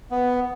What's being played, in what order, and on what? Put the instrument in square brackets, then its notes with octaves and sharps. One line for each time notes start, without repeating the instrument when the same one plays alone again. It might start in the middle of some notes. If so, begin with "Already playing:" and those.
[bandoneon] B3